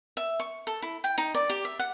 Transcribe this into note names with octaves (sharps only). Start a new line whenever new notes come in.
E5
C#6
A4
E4
G5
D#4
D5
G4
E5
F#5